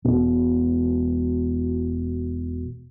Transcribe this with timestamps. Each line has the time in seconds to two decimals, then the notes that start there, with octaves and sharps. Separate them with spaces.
0.05 E1 B2